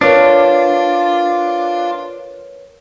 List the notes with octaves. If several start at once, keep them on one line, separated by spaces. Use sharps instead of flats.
D4 F4 A#4 B4 C#5